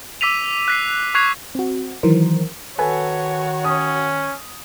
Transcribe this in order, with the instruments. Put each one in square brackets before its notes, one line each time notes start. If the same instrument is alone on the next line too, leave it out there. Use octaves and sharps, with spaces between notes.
[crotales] D6 E6 B6 D#7 F7
F#6 B6 C7
C#6 F#6 G#6 C7 F7
[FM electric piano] C4 F#4
D#3 E3 F#3 A#4 C5
[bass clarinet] D#3 [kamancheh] F#4 C#5 [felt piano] A4 B4 G#5
[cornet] C#4 [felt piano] D#6